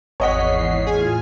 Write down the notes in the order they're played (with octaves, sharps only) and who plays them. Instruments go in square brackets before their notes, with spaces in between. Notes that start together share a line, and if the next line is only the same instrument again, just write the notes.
[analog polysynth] G#1 B6 [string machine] E2 C7 [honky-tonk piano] C#5 D#5 F#5
[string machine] A2 F4 F6 [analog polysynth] G#4 G#5